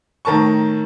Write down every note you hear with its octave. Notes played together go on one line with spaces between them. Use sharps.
A2 D#3 A#4 A5 C#6